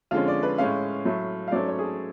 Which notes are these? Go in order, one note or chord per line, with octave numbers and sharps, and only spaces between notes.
F2 D3 G#3 C#4 F4
D5
B4
A2 G#3 C#4 F5
A2 F#3 A3
F5
G#2 F#3 A3 C#4 D5
C#5
G#4
A4